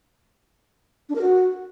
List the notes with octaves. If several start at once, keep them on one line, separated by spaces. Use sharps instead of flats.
D4
A#4
F#4